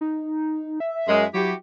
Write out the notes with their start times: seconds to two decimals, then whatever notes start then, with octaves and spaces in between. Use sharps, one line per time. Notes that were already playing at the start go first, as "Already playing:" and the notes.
0.01 D#4
0.80 E5
1.07 F#2 G#3
1.34 F#3 E4 F#4 G4